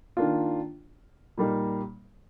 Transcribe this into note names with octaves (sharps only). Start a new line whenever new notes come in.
D#3 A#3 D4 F4
A#2 G3 A#3 D#4